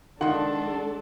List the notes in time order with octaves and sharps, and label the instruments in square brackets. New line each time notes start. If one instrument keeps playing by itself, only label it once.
[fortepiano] D#3 [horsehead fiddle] G#3 A4 [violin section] D4 [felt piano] F#5 C6